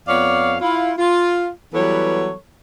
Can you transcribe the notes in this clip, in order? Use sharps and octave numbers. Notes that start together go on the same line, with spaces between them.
F2 B3 C#5 D5 F5
E4 F4
F4
E3 F#3 G3 B3 A4 C#5